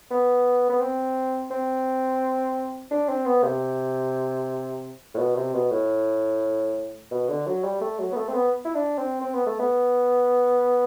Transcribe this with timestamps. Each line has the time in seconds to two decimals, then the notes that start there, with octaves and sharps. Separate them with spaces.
0.11 B3
0.70 B3
0.81 C4
1.51 C4
2.91 D4
3.09 C4
3.26 B3
3.44 C3
5.14 A2
5.18 B2
5.36 C3
5.54 B2
5.71 A2
7.11 B2
7.28 D3
7.46 F#3
7.64 G3
7.81 A3
7.99 F#3
8.12 B3
8.16 A3
8.29 C4
8.34 B3
8.65 E4
8.75 D4
8.98 C4
9.21 C4
9.34 B3
9.46 A3
9.60 B3